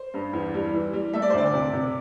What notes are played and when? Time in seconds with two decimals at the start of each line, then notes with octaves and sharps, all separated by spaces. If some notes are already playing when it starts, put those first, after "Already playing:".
Already playing: C5
0.14 G2
0.33 E2
0.54 G3
0.74 E3
0.93 G3
1.13 A3 E5
1.22 D5
1.30 C5
1.34 D2 D5
1.53 C3
1.73 C3